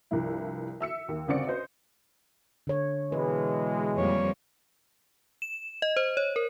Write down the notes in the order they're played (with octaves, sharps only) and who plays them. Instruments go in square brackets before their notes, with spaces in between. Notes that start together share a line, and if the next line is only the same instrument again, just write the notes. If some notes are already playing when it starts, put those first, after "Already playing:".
[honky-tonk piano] C2 G2 F3 E4
E5 E6 C#7
D#2
G1 C#3 C4 F#4 D5 C#7
B4 C5 D#5
[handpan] D3 C#5
[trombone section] B2 E3 G#3 [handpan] B4
[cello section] F2 G3 A#3 [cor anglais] C#5
[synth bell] E7
D#5
C5
C#5
A#4